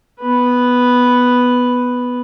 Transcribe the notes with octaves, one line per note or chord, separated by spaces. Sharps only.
B3 B4